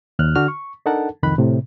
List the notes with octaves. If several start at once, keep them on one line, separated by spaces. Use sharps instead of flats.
D#2 F6 F#6
D3 D4 F#4 F6
C#6
D4 D#4 A4 A#4 F#5 A5
C2 F2 D#3 B5 F#6
A2 C3